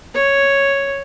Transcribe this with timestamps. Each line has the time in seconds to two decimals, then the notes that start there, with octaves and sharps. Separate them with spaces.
0.15 C#5